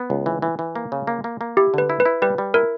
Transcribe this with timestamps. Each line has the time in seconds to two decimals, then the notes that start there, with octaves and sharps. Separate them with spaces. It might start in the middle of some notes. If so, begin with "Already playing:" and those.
Already playing: B3
0.10 C#2
0.26 E3
0.42 E3
0.59 E3
0.76 A#3
0.92 C#3
1.07 A#3
1.24 A#3
1.41 A#3
1.57 E4 G4
1.74 D3 B4
1.89 E4
2.00 B4
2.05 E4
2.22 G3 B4
2.38 G3
2.54 E4 A#4